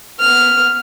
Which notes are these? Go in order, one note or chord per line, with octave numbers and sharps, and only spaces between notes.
B3 F6